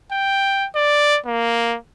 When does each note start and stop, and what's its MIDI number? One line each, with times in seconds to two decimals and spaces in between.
0.12 0.67 79
0.75 1.18 74
1.26 1.77 58